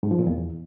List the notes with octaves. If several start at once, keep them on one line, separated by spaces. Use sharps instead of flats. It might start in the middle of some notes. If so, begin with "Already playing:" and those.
G#2
F3
A#2
E2